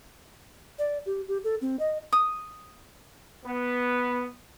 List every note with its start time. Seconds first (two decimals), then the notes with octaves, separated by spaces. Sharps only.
0.79 D5
1.06 G4
1.28 G4
1.44 A4
1.61 C4
1.79 D#5
2.13 D#6
3.45 B3